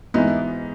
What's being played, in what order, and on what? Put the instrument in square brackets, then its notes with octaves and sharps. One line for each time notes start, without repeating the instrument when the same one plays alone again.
[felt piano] G#2 E3 B3 D#4